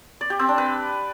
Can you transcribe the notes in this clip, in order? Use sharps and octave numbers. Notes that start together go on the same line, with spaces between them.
D5
G4
C4
D4
B4